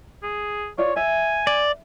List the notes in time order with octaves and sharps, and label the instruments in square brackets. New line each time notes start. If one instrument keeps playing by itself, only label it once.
[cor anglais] G#4
[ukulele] F4 D5 [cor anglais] C#5
[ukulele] E5 [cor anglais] G#5
[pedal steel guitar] D5